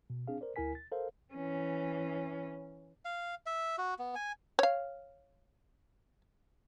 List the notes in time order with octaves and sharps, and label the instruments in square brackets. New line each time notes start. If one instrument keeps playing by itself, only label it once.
[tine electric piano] B2
C4 D4 G#4 F5
A#4 C5 D5
D2 E4 A#4 G#5 B6
A6
A4 A#4 C5 F5
[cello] E3 C#4
[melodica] F5
E5
F#4
B3
G#5
[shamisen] C#5 F5